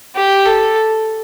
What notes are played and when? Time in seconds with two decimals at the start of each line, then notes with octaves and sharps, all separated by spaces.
0.16 G4
0.46 A4